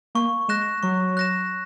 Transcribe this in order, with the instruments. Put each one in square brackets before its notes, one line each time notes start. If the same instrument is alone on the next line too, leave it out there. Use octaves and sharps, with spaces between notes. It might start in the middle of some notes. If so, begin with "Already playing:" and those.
[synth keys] A#3 [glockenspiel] C#6
[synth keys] G#3 [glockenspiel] F#6 A#6 E7
[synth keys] F#3 [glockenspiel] C#6
[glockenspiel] F#6 A#6 E7